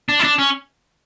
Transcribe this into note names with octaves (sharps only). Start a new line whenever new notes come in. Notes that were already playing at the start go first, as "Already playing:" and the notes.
D4
E4
D4
C#4